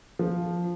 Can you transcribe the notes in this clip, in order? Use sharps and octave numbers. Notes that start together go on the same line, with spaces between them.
F3